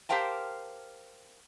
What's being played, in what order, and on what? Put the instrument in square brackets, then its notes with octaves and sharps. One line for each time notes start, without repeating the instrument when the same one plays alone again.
[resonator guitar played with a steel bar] G4 A#4 C5 F5 G5 A5